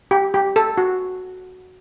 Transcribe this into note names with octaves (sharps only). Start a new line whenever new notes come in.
G4
G4
A4
F#4